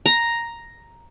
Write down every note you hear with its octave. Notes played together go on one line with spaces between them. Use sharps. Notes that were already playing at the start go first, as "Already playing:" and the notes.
A#5